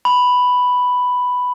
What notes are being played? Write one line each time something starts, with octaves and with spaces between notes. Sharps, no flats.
B5